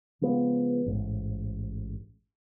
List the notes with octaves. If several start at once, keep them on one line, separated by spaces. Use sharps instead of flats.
C#3 F3 G#3 B3
A1 G#2